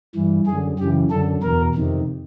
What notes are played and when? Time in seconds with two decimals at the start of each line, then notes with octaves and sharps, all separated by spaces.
0.15 G2 E3
0.46 F#2 D3 G#4
0.79 F#2 C#3 E3 G4
1.11 F#2 D3 A4
1.42 E2 B2 A#4
1.75 F2 C3 D#3